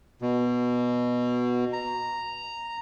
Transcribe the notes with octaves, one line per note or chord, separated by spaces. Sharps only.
B2
A#5